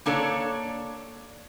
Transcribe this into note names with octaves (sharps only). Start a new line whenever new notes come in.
A#3 D4 A4 C#5 D5